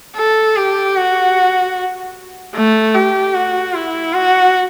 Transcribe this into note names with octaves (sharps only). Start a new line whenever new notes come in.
A4
G4
F#4
A3
G4
F#4
E4
F#4